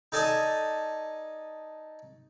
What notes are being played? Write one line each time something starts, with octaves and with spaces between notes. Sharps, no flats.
D#4 A4 D5 G#5 A5 D#6